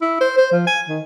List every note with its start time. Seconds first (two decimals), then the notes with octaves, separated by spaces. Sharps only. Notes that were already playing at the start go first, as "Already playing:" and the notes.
0.02 E4
0.21 C5
0.38 C5
0.52 F3
0.67 G#5
0.89 D#3